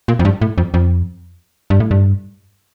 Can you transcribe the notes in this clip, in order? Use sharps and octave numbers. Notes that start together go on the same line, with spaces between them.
A#2
F2
G2
A2
F2
F2
G2
A2
G2